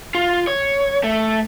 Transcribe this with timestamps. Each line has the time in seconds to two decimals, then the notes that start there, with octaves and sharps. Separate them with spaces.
0.15 F4
0.47 C#5
1.03 A3